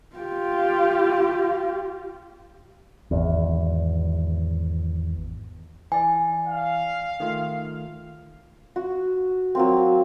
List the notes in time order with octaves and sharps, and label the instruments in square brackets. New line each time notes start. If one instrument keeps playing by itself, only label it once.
[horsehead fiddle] F4 G4
[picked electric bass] G#1 E2
[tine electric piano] E3 D5 [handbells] G#5
[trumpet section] F5
[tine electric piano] D#3 A3 F4
[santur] F#4
F#3 A#3 C4